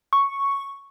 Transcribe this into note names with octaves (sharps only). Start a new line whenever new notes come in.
C#6